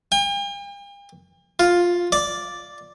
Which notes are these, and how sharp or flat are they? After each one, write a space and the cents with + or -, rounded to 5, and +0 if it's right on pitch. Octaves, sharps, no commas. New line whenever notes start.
G5 +45
F4 +5
D5 +0